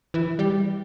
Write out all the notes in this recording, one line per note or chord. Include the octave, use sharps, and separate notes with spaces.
E3
G3